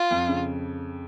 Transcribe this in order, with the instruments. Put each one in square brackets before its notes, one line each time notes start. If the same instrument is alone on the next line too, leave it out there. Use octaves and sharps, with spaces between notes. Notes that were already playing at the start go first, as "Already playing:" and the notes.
Already playing: [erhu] F4
[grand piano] F2
C#3